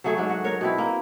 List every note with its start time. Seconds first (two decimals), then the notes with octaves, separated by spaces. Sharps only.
0.04 F#3 A3 G#4 A4
0.17 G#2 F#3 D4
0.30 F#4
0.44 A#4 C#5
0.61 B2 C4 E4
0.78 A#3